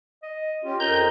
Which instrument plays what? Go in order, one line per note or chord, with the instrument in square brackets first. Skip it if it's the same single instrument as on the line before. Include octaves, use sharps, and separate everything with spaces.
[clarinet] D#5
[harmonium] C#4 F4 G4
[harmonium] F2 A#4 D#5 [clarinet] A#5 [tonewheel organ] G6